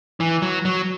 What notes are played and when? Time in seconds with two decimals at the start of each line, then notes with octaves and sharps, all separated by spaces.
0.20 E3
0.42 F#3
0.65 F#3